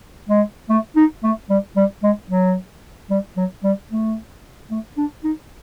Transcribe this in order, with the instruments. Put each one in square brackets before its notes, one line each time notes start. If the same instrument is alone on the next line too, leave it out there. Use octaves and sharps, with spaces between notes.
[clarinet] G#3
A3
D#4
A3
G3
G3
G#3
F#3
G3
F#3
G3
A3
A3
D4
D#4